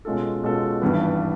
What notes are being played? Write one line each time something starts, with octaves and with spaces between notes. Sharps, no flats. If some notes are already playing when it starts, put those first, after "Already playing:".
B2 G#3 C#4 F4 A4
B2 G#3 C#4 F4 A4
G#1 G2 E3 G3 B3